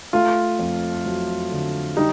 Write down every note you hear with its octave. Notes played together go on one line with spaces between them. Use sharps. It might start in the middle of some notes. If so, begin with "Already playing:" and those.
A3 F4
F2
F#3
D3
G3 D#4